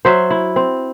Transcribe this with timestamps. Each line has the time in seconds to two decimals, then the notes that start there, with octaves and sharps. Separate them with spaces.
0.05 F#3 C5 E5
0.31 E4
0.56 C4